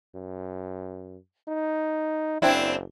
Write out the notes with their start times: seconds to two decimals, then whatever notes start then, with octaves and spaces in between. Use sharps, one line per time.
0.15 F#2
1.48 D#4
2.42 F#1 C4 D4 E4